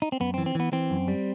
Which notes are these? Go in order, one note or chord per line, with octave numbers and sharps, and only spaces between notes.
D#4
C4
F#2 B3
C4
E3
C4
E3 B3
E3 C4
F#2
G3